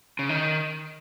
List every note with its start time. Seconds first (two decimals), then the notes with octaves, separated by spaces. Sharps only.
0.19 C#3
0.29 D#3